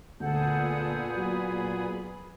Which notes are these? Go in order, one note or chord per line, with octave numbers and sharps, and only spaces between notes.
D2 A#2 B3 G#4 A4 F#5 G6
F#3 B5